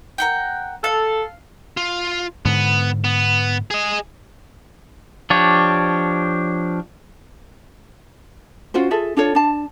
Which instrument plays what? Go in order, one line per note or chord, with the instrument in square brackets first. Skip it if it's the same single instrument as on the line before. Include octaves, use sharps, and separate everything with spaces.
[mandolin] A#4 F#5 G5
[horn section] A4 [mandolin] F5
[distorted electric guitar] F4
[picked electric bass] G#2 D3 [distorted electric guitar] B3
[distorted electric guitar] B3
G#4 D#5
[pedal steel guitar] F3 D4 G4 C#5
[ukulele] C#4 F4 F#4 C5
F4 G#4 A4 E5
D4 F4 A4 C#5
D4 A5